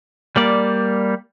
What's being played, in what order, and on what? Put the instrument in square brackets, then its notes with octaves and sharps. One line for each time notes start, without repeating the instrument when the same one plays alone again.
[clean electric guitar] G3 A#3 D5